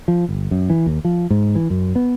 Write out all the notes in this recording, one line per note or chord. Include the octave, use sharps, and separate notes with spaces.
F3
G1
F#2
E3
D#2
F3
G#2
E3
F#2
B3